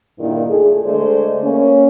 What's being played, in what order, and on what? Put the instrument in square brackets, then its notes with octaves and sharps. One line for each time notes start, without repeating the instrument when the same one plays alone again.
[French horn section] E2 G2 A#2 D#3 E3
A3 G#4
D3 G#3 A3 C5 D5
A#3 C#4